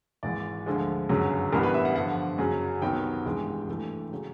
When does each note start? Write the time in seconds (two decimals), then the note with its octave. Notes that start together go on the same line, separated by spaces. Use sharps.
0.23 G#1 G#2 E3 D5
0.66 D2 D3 F3 G#3
1.09 G1 F#2 C#3 F#3
1.53 A1 G2 E3 G3 B3 A#4
1.63 B4
1.74 E5
1.85 F#5
1.96 G2 D3 F3 F#5
2.38 F#2 C#3 F#3
2.82 C2 C3 D#3 F#3 B3 G5
3.25 G#1 G2 E3 G#3
3.68 G2 E3 A3
4.12 C#3 F#3